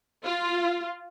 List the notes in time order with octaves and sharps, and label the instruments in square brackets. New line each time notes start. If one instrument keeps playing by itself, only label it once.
[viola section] F4